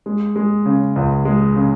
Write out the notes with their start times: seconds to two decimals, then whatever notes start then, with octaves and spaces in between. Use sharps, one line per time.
0.06 G#3
0.36 G#3
0.65 C#3
0.96 C#2
1.25 G#3
1.55 C#3